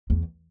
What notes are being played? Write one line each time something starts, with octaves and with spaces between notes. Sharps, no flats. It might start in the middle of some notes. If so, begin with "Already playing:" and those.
E2